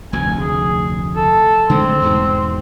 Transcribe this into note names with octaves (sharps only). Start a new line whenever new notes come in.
F1 D2 G#5
G#4
A4
D3 G#3 A3 C4
E2 G#2 B2